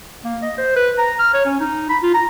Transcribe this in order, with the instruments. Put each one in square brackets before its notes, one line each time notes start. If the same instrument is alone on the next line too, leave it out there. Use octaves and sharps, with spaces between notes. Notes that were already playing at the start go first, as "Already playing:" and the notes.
[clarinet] A#3
D#5
C5
B4
A#5
F6
C#5
C#4
D#4
B5
F4
A#5